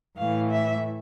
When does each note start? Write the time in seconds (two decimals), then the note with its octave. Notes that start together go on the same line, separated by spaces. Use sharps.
0.18 A2 E3 A3 F5
0.50 E5